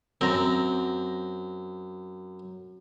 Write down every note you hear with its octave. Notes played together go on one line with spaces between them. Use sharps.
F#2 C4 A#5